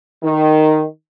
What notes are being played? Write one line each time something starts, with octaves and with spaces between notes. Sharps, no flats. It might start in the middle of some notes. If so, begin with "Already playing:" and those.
D#3